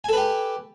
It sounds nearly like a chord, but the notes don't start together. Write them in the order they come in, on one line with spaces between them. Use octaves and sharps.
G#5 A4 B4 G4